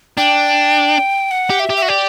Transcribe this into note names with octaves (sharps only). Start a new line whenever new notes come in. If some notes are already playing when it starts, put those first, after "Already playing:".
D4 G5
F#5
G4
E5
G4
E5
F#4
G4 D5